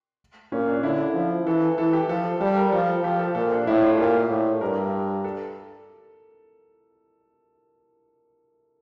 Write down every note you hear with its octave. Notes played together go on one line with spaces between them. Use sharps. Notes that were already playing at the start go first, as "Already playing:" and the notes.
A#2 C#4
D4
D3 E4
F3
E3 A4
E3 A4
G4
F3 A4
G3 A4
A#4
F3 A4
F3 G4
A4
A#2 A4
D4
A2 E4
F4
A#2 G4
A2
G2 A#4
A4